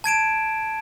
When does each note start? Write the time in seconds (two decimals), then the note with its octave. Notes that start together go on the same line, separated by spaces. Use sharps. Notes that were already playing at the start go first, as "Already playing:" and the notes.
0.04 A5 G#6 D7 E7